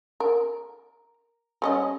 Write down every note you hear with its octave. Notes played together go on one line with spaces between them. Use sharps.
A#4
G3 C#4 D#5